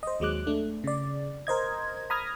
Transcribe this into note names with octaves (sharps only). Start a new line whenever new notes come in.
C5 D#5
D#2 F#3 G#3 D6 F#6
A3 D4
C#3 D5
A#4 C5 D#5 G#6
A#5 B5 D#6 F6 G#6 A#6